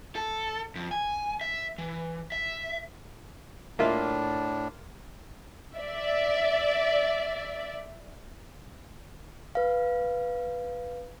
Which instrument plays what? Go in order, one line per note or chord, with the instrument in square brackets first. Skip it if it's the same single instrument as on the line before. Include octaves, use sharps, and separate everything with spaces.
[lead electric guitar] A4
F2
G#5
E5
E3
E5
[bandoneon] A2 D4 [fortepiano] A#3 F4 E5
[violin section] D5 E5
[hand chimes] B4 F5